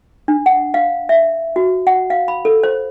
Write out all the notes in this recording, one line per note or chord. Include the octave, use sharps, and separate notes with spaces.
D4
F#5
F5
E5
F#4
F#5
F5
B5
A4
C5